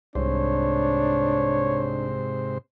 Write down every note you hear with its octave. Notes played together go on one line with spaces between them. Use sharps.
C2 G#2 C3 D4 C5 C#5